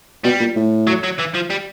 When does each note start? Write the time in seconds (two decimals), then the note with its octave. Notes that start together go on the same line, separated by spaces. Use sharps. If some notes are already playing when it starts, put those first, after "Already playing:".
0.24 B2 G3
0.40 A#2
0.56 A2
0.87 F#3
1.03 F#3
1.18 E3
1.34 F3
1.50 G3